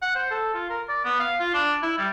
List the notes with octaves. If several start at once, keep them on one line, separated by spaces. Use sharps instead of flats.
F#5
C5
A4
F4
A#4
D5
B3
F5
F4
D4
E4
G3